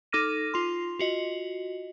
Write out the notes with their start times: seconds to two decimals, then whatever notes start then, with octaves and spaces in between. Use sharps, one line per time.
0.12 D#4 A4 D6 F6 A#6 D#7
0.54 F4 C6
0.99 F4 F#4 D#5